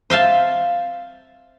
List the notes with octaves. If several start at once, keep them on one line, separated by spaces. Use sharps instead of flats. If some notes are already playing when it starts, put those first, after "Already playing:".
C5 E5 F5 A5